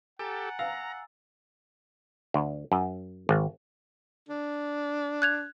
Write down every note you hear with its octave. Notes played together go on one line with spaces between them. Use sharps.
G4 A4 F#5 G#5 A#5 A6
F5 A#5 E6
D2
F#2
G#1
D4
F#6 G#6 F7